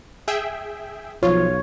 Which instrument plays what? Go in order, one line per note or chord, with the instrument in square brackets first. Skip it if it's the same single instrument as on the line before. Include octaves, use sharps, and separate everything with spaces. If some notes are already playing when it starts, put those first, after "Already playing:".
[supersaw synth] G#4 E5 G5
[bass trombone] B1 [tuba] F3 [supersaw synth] F4 [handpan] C#5